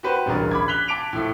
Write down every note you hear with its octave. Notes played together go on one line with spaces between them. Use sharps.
F#4 G4 B4 C5
D1 A1 G2 G#4 A#4 D5
B5 D6 G#6
F#6 B6 F7 G7
A5 D6 D7 F7
A2 F3 A3